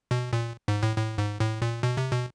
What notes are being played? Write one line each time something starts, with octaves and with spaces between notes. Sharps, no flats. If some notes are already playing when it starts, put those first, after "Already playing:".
B2
A#2
G#2
A2
A2
G#2
A2
A#2
B2
C3
B2